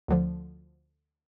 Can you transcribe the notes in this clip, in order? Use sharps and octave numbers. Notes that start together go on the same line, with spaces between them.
D2 D3 F3